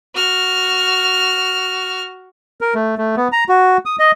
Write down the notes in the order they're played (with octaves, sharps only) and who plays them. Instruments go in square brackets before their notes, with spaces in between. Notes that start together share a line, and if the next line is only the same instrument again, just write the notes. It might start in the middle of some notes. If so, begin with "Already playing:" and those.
[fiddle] F#4 F6
[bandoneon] A#4
A3
A3
B3
A#5
F#4
D#6
D#5